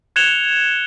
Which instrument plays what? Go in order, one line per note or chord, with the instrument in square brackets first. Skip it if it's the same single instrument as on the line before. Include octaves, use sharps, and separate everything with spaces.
[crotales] F#6 G#6 C#7 E7 F7 G7